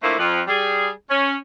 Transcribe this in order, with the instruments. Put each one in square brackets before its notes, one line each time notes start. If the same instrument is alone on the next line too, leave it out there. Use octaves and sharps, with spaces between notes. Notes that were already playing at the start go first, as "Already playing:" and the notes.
[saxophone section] A2 F3 A3 A#3 D4 E4
F2 F3
G3 G#4
C#4